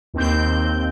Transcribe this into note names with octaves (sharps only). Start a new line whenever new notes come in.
D#2 C4 G6